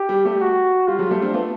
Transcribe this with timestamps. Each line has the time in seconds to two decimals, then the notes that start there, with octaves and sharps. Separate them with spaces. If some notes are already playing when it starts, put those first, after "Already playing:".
Already playing: G4
0.09 G3
0.25 G3 A3
0.40 F#4
0.87 G3 F4
0.99 F#3 G#3
1.10 G3 A3
1.22 C4 D4
1.34 A3 B3